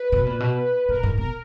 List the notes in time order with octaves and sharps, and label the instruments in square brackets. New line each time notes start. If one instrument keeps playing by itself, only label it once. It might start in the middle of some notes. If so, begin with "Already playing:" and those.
Already playing: [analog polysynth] B4
[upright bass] B2
A#2
B2
[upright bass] A#2 [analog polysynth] A#4
[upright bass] G#2
[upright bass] B2 [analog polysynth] A#4